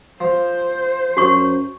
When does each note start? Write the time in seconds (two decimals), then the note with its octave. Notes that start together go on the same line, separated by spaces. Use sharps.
0.21 F3 C5
1.17 F#2 F#4 C#6